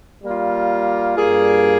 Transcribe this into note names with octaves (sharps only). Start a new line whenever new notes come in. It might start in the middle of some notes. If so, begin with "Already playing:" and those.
G3 A#3 F4
G2 G3 A#3 F4 G#4